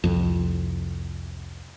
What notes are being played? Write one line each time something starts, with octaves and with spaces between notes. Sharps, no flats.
C2 F2